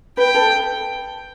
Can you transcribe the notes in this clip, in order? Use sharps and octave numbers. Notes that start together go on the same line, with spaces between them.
B4 G5
A4